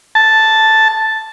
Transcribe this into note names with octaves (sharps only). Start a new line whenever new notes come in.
A5